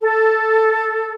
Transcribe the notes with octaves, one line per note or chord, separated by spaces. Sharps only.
A4